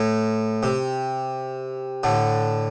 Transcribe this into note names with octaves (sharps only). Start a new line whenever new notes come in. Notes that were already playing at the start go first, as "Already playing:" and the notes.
Already playing: A2
C3
A2 D3